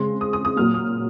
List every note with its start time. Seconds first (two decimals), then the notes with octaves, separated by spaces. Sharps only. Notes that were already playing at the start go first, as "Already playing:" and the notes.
Already playing: C#3 G#3 C4 C6
0.21 D#6
0.33 D#6
0.45 D#6
0.56 A#2 F#3 A#3 F6
0.74 D#6